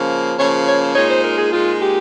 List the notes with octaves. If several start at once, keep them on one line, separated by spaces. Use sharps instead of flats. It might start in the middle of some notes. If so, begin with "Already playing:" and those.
Already playing: C#3 F3 A#3
C#3 F3 A#3 C#5
C#5
C5
A#2 G#3 D#4 C#5
C5
A#4
G#4
A#2 G#3 D#4 F4
G4